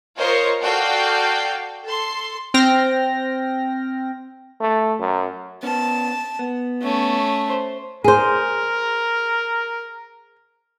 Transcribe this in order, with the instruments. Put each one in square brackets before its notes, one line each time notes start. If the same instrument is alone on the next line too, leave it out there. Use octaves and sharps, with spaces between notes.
[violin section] F4 A#4 C5 C#5 D#5 C#6
F#4 A4 D5 F5 G5
A4 C6
[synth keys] C4 G5 F6 A#6
[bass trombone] A3
F#2
[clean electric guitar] B3 C#4 [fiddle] A5
[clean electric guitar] B3
[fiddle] A3 C#4
[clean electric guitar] C5
[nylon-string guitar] G#4 C5 [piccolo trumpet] A#4